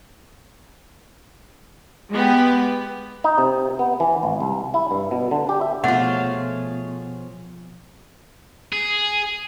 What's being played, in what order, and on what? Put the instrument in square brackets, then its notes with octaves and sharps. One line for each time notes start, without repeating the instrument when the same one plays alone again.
[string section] G#3 B3 G4
[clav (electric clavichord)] D#4
C3
B3
E3
G#1
C2
E4
G2
B2
D3
G4
E5
[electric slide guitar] B2 [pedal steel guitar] F3 G#4 C#5 [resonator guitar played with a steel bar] A3 F4 [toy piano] F#5
[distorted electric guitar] G#4